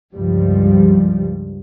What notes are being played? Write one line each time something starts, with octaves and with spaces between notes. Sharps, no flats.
C#2 G2 F3 G3